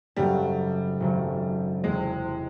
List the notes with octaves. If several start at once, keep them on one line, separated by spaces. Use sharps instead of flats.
G#1 F#2 C#3 F#3 G3 A3
G#1 F#2 C#3 F#3 A3
E1 E2 C3 G#3